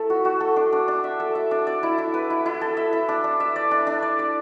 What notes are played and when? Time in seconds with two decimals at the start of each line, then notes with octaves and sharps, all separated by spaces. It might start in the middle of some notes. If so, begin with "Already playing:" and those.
Already playing: A3 E4 A4
0.10 F#4
0.25 F#4
0.40 A4
0.56 D4
0.72 D4
0.88 D4
1.04 E5
1.20 A4
1.35 E5
1.51 D4
1.67 D5
1.83 E4
1.98 E4
2.14 B4
2.30 E4
2.46 E4
2.61 A4
2.77 E5
2.93 E5
3.09 D4
3.24 D4
3.40 E5
3.56 D5
3.71 D4
3.87 D4
4.02 D5
4.19 D5